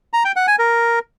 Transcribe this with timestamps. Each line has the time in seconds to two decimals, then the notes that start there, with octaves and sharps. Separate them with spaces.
0.13 A#5
0.25 G5
0.36 F#5
0.48 G#5
0.59 A#4